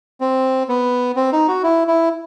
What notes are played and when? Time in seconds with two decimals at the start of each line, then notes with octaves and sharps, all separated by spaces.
0.20 C4
0.69 B3
1.16 C4
1.33 D#4
1.48 F#4
1.63 E4
1.88 E4